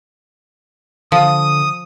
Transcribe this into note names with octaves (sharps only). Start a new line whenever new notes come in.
D3 F3 D#6